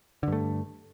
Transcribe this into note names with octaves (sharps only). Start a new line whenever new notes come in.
G2 D3 A3